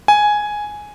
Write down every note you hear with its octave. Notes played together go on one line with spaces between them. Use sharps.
G#5